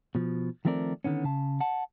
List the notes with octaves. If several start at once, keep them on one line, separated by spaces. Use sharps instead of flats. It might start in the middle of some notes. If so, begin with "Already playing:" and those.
B2 F3
D#3 F3 A3 C4 A#4 D5
D3 D#3 B3 C#4
C#3 A5
F#5 A5